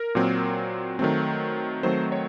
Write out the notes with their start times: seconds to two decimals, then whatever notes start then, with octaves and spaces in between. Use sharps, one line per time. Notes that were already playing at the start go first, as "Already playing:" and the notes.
Already playing: A#4
0.15 A#2 F#3 C4
0.99 D#3 F#3 A3 C4
1.83 D#3 F#3 A3 C4 C5
2.12 C#5